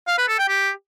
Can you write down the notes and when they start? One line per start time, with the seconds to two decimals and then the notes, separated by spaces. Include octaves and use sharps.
0.08 F5
0.18 B4
0.28 A4
0.39 G5
0.49 G4